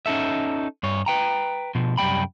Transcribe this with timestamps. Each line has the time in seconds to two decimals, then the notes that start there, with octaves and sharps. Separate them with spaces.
0.06 C#4 D#4 A4 E5
0.83 G2 C#5
1.06 B4 G5 A#5
1.75 B2 F3
1.98 C2 F#2 G3 G#3 G5 B5